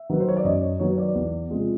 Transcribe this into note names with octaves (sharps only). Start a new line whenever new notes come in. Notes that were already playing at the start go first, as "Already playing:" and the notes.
Already playing: E5
D#3 F#3 B3 B4
C5
C#5
D5
F#2 D#5
C#5
D#3 F#3 B3 C#5
D5
E2
C3 F3 G#3